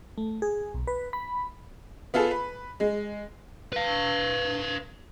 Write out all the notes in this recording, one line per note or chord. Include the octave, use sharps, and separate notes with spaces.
A3
G#4
B1
B4
B5
B3 F4 G#4 A4
B4
G#3
B4 F5